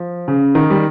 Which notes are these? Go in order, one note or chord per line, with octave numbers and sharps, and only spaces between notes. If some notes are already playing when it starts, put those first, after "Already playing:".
Already playing: F3
C#3
D#3
G3